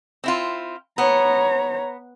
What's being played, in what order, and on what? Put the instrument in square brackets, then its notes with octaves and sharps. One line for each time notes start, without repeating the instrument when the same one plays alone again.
[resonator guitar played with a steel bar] C4 E4 F4
[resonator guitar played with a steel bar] B3 [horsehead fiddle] C#5 A#5